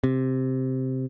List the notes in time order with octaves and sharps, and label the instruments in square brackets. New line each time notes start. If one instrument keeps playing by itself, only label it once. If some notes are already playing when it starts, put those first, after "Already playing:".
[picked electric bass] C3